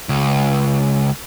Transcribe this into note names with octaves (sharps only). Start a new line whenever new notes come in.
C#2